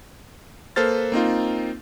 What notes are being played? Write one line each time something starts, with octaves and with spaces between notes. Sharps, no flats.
A#3 A4 B4 C5 F6 A6
A#3 C4 D#4 F4